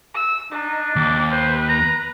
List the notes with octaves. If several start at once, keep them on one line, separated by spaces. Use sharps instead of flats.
E6
D4 D#4
D#2 D6
B4 C5
A#5